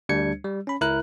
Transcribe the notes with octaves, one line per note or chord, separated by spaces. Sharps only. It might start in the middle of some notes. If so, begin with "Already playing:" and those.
D2 G3 D4 G#6 C#7
G3
C#4 B5
C#2 E4 A#4 F#6